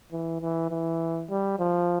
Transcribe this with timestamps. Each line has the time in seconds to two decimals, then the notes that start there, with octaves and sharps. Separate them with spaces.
0.12 E3
0.41 E3
0.71 E3
1.30 G3
1.59 F3